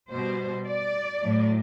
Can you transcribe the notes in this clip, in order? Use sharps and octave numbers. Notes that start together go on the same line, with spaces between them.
B2 G3 C5
D5
A2 F#3